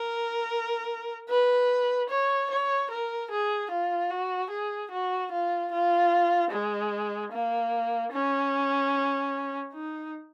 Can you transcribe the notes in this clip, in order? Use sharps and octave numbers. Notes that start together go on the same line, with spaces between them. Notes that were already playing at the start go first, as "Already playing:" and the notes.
Already playing: A#4
B4
C#5
C#5
A#4
G#4
F4
F#4
G#4
F#4
F4
F4
G#3
A#3
C#4
D#4